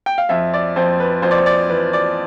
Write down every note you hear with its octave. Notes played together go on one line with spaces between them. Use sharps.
G5
F5
F2 E5
D5
F2 C5
B4
F2 C5
D5
C5
D5
E3 B4
D5